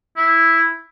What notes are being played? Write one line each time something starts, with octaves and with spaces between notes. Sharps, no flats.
E4